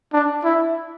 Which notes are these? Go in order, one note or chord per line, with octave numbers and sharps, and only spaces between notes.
D4
E4